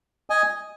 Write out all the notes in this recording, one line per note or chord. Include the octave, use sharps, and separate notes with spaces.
D#5 G#5